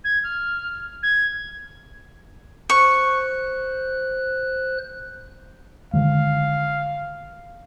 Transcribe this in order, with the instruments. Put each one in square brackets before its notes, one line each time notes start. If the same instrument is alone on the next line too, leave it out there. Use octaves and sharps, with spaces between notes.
[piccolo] G#6
F6
G#6
[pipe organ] C5 F#6 [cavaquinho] C#6
[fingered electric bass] D3 D#3 G#3 [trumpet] F5